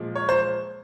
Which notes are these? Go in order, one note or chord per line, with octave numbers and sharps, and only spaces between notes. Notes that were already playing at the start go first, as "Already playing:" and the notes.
Already playing: A#2 F3 G#3
C#5
C5